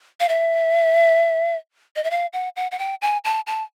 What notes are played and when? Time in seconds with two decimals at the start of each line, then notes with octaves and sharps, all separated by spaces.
0.20 F5
0.29 E5
1.96 D#5
2.04 E5
2.11 F5
2.33 F#5
2.56 F#5
2.71 F#5
2.79 G5
3.02 G#5
3.24 A5
3.47 A5